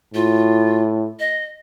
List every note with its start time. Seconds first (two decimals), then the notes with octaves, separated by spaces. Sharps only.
0.14 A2 F4
1.19 D#5